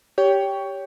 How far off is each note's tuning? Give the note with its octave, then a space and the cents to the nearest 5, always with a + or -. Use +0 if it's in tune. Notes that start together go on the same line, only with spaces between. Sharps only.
G4 +0 C#5 +20 G5 +0